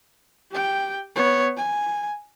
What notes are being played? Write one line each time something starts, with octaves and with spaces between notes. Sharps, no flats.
G4 G5
B3 C#5
G#5